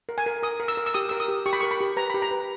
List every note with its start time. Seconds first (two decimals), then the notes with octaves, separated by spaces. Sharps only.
0.09 A#4
0.18 G#5
0.26 A#4
0.43 A#4 D#6
0.60 A#4
0.68 E6
0.77 A#4
0.86 E6
0.94 G4 D#6
1.09 A#4 E6
1.20 D#6
1.28 G4
1.46 G4 C#6
1.53 B5
1.61 A#4 C#6
1.71 B5
1.81 G4
1.97 B4 A#5
2.10 G4 B5
2.22 A#5
2.31 B4